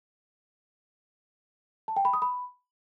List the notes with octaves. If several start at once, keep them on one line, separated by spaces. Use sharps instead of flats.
A5
G5
B5
D#6
B5